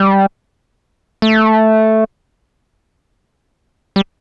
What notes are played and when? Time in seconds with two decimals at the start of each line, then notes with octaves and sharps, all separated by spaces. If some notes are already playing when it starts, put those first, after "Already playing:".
Already playing: G3
1.22 A3
3.96 G3